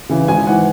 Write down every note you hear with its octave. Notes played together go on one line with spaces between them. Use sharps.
C#3 E3
G#1 G#5
G#2 E3 F#5